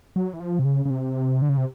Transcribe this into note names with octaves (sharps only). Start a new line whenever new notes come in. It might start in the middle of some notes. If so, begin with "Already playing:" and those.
F#3
E3
F3
C3
C#3
C#3
C3
D3
C#3
C3